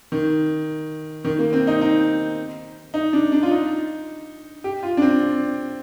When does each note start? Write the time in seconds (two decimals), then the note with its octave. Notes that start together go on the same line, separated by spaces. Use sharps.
0.12 D#3
1.25 D#3
1.39 A#3
1.53 C4
1.67 D#4
1.81 D#4
2.94 D#4
3.13 D4
3.32 D4
3.43 F4
3.51 D#4
4.64 G4
4.83 F4
4.97 D4
5.02 C4